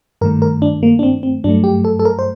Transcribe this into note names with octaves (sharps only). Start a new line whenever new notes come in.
G2 D#3 A3 A#4
A#4
D4
A#3
D4
C4
C4
G2 F#3 A3 D4
G4
A4
A4
A#4
C5